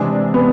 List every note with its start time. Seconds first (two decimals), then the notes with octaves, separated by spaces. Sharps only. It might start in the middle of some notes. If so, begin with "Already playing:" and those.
Already playing: C3 E3 G#3 C4 D4 G#4
0.34 B3